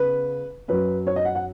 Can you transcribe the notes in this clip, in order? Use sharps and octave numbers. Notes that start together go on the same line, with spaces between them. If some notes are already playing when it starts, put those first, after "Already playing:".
Already playing: C#3 B3 B4
F#2 F#3 C#4 B4
C#5
D#5
F#5
F#5